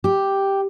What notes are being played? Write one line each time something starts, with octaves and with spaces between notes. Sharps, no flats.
G4